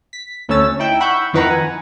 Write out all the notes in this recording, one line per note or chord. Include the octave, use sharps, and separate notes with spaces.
B6
D2 A3 C#4 C#5 E6 A6
D#4 E4 G5
F#5 B5 C#6 E6 G6
F2 D#3 E4 B4 F#5 A#5
G#5